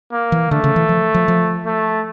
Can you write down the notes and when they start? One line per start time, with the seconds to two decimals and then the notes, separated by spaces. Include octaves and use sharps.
0.12 A#3
0.32 E3
0.51 D3 A3
0.64 C#3
0.76 E3
0.89 F3
1.14 F3
1.28 F3
1.66 A3